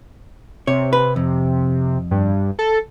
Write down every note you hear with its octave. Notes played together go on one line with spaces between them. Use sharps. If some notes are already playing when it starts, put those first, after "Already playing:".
C3 C#5
B4
F2
G2
A4